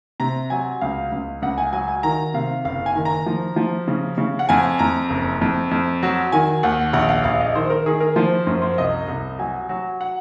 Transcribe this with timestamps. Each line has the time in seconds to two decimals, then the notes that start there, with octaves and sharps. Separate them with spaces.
0.20 C3 A#5
0.50 F#3 G#5
0.81 C#2 F5
1.12 C#2
1.42 C#2 F#5
1.58 G#5
1.73 F#3 G#5
1.88 G#5
2.03 D#3 A#5
2.34 C3 F5
2.65 F#1 F5
2.86 G#5
2.96 D#3
3.05 A#5
3.26 F3
3.56 F3
3.88 C#3
4.18 C#3
4.39 F#5
4.49 F2 G#5
4.79 F2 A#5
5.10 F#1
5.41 F2
5.71 F2
6.03 F#3
6.32 D#3 G#5
6.63 D#2 F#5
6.93 A#1 F#5
7.09 F5
7.24 A#1 F5
7.40 D#5
7.55 D#3 C5
7.70 A#4
7.86 D#3 G#4
8.00 A#4
8.16 F3 C5
8.46 F#2 C5
8.62 C5
8.78 C2 D#5
9.08 C2
9.39 F#3 G#5
9.69 F#3
10.01 F#5